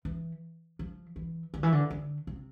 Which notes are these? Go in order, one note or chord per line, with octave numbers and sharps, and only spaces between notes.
E3
F3
E3
D3
E3
D3
D3
C3